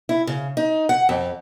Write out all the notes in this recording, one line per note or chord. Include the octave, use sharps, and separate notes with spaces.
E4
C#3
D#4
F#5
F2